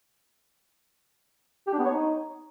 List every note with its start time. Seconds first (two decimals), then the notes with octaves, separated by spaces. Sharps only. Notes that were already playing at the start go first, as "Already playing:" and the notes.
1.67 G4
1.73 D4
1.79 B3
1.85 C#5
1.91 D#4